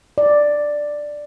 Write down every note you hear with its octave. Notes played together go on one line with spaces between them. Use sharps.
D5